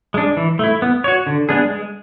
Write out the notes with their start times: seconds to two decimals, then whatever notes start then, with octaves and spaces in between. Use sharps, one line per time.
0.14 G#3 D4
0.37 E3
0.59 A3 E4
0.82 B3
1.04 F#4 C#5
1.27 D3
1.49 G#3 B3 D4 G#4
1.70 G#3